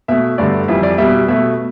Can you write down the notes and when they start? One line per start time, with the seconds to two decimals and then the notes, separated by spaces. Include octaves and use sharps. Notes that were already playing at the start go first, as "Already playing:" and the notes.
0.08 B2 A3 E5
0.38 G2 D3 A3 D5
0.68 F2 E3 G3 E5
0.83 D5
0.98 B2 G3 E5
1.28 B2 A3 E5